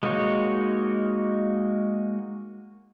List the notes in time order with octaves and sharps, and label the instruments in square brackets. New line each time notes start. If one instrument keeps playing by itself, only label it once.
[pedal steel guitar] G#3 A#3 D#4 F#4 C#5